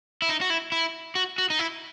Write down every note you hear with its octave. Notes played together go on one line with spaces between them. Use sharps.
E4
D#4
F#4
E4
E4
F#4
F#4
D#4
E4